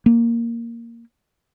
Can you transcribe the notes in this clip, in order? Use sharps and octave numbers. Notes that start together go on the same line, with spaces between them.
A#3